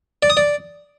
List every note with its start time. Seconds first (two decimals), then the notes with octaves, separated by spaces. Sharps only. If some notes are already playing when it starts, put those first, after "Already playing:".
0.23 D5
0.30 D#6
0.37 D5